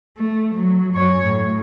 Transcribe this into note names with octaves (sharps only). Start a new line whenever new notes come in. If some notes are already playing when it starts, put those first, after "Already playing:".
A3
F#3
F#2 C#5
A2